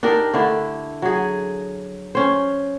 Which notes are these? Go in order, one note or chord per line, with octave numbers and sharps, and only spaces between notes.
D4 D#4 G4 A#4
D3 A3 D4 E4
F#3 G#4
C#4 C5